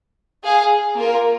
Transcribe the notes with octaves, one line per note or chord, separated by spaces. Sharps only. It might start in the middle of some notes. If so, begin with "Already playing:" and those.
G#4 F5 G#5
A#3 F4 A#4